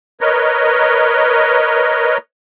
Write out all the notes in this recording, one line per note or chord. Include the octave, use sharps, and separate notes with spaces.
A#4 B4 C#5 D#5